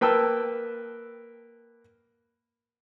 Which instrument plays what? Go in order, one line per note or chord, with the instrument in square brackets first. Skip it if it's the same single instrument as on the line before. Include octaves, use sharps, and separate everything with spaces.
[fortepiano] A#3 B4 G5 A5 E6